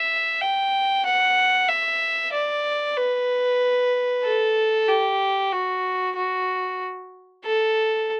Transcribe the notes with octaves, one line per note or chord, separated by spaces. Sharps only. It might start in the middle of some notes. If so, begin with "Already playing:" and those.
Already playing: E5
G5
F#5
E5
D5
B4
A4
G4
F#4
F#4
A4